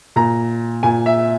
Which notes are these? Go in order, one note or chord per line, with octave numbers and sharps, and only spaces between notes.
A#2 A#5
A#2 G#5
E5